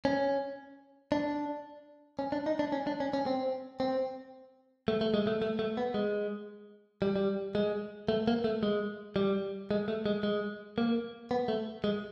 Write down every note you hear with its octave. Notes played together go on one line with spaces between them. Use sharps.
C#4
D4
C#4
D4
D#4
D4
C#4
D4
C#4
C#4
C4
C4
A3
A3
G#3
A3
A3
A3
B3
G#3
G3
G3
G#3
A3
A#3
A3
G#3
G3
G#3
A3
G#3
G#3
A#3
B3
A3
G#3